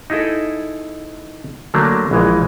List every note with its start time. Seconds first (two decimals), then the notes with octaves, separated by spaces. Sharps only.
0.10 D#4 E4 G#4 A4
1.74 D3 F#3 A3 A#3 D4
2.11 A#1 E3 G#3